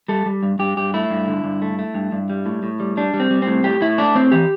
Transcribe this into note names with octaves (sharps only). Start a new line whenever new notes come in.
G3 A4
G3
G2
G2 G4
G2 G4
A3 E4
G2
D3
G2
A3
A3
G2
G2
G3
A2
A2
G3
G3 D4
G3
C4
G3
A2 C4
A2 G4
A2 E4
A3 D4
A2 C4
E3 G4